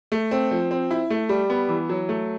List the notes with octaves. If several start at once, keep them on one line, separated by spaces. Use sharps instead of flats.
A3
C4
F3
C4
E4
A3
G3
B3
E3
F#3
A3